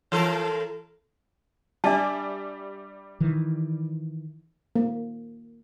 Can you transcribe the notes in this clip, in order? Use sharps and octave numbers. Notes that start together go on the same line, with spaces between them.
E3 A4 A#4
G3 D4 D5 E5 A5
D#3 E3
A#3